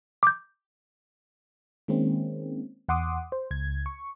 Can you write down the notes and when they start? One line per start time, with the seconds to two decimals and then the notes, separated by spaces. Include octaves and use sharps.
0.23 D6 G6
1.88 D#3 G#3 A#3 C4 C#4
2.89 E2 F#5 C6 D6 D#6
3.32 C5
3.51 C#2 G#6
3.86 C#6